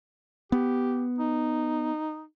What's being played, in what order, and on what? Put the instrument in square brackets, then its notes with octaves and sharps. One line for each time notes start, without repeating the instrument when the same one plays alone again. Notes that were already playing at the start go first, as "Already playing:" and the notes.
[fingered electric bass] B3 [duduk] G4
[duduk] D#4